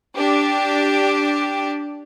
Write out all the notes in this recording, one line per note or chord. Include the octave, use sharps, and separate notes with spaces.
D4 G4